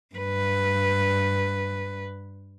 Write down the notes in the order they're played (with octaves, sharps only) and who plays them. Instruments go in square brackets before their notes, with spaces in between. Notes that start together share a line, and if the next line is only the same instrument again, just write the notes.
[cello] G2 B4